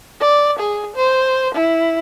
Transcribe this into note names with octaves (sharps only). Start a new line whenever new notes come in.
D5
G#4
C5
E4